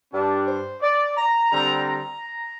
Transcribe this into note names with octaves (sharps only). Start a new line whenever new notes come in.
G2 G3 D4
C5
D5
A#5
D3 G3 C4 A#5
A#5